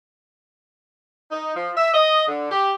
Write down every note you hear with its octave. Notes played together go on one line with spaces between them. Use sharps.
D#4
F3
E5
D#5
D3
G4